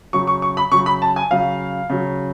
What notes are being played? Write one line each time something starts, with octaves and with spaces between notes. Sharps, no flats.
C#3 F#3 C#6
C#6
C#6
B5
C#3 F#3 C#6
B5
A5
G#5
C#3 F#3 F5
C#3 F#3